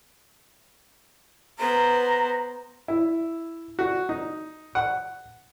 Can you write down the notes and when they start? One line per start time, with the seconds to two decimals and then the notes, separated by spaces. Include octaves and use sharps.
1.59 B3 C5 A#5
2.88 E4
3.79 F#4
4.09 D#4
4.75 F#5